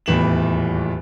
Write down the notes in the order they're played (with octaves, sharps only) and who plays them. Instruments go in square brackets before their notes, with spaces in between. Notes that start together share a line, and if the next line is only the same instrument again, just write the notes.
[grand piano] D#1 E2 A2 E3 E7 F#7